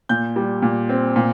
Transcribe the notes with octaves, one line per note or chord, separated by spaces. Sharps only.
A#2 G6
G3
A#2
C4
A#2